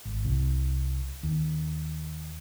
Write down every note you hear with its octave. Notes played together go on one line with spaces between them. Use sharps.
G#1
C2
D#2